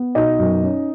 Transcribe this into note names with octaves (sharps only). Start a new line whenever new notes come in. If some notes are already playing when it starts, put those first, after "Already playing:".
Already playing: B3
B2 D#4 D#5
F#2
C#4